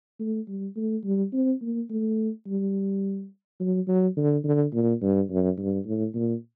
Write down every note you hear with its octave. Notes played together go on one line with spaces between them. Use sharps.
A3
G3
A3
G3
C4
A#3
A3
G3
F#3
F#3
D3
D3
A#2
G2
F#2
G2
A2
A#2